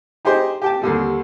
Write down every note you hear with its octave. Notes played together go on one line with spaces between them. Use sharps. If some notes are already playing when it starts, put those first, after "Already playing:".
D#4 G4 G#4 C5 D#5
G4 G5 A5
D#2 D3 G3